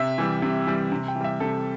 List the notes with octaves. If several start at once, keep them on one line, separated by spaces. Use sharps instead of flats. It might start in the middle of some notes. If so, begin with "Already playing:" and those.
Already playing: C3 E5
E3 G3
C3
E3 G3
C3
G5
E3
G3 E5
C3 A4